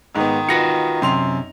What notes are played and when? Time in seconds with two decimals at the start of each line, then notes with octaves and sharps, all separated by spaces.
0.16 G#2 D#3 B3
0.49 F4 F#4 B4 A#6 C#7
1.02 F#2 C3 C6 F7